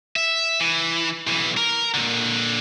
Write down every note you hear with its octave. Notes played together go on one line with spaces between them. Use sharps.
E5
E3
B1 E3
A#4
A#2 D3